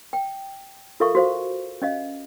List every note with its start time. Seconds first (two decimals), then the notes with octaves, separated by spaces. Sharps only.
0.13 G5
1.00 F4 A4 A#4 E5 F5 C#6
1.15 F#4 C5 F5
1.82 C#4 D#5 F5